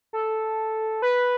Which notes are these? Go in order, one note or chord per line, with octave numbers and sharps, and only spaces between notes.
A4
B4